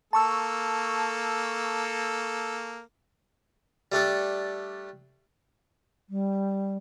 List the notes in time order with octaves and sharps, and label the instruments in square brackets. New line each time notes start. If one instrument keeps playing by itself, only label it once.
[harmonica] A#3 A4 [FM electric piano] A5 C#6 E6
[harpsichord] G3 A3 D4 A4
[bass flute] G3